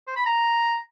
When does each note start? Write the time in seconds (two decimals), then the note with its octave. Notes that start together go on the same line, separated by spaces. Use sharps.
0.07 C5
0.16 B5
0.26 A#5